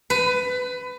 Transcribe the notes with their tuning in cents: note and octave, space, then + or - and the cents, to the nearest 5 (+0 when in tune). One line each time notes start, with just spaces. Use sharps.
B4 +20